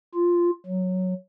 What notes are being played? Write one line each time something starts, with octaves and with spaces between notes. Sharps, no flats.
F4
F#3